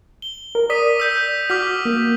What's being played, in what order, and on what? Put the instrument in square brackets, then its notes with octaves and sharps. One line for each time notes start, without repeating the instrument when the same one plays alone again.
[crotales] G7
[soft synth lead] A#4
[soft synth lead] D5 [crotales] D#6 B6 D#7
[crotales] E6 G6 B6
[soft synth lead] F#4 [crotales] D6 F6 B6
[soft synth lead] A#3